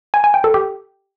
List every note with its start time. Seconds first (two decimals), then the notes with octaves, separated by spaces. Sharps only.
0.14 G#5
0.24 G#5
0.34 G5
0.44 A4
0.54 G4